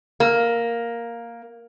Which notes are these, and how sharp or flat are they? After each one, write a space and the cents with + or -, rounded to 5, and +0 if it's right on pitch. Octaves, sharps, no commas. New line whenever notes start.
A#3 +0